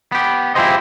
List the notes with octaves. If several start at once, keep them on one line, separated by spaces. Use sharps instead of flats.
B3 G4
E4 F4 G4 G#4 C5 D#5